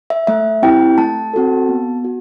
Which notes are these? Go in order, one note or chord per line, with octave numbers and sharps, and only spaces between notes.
E5
A3 E5
C4 E4 G4 G5
A3 A5
C4 F#4 A4
B3
F#4